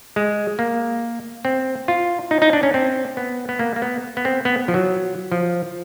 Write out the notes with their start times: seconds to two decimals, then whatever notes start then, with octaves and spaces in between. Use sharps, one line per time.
0.16 G#3
0.59 A#3
1.45 C4
1.88 F4
2.31 D#4
2.42 D#4
2.53 D4
2.63 C#4
2.74 C4
3.17 B3
3.49 B3
3.59 A#3
3.76 A#3
3.82 B3
4.17 B3
4.25 C4
4.45 B3
4.68 F3
4.74 F#3
5.32 F3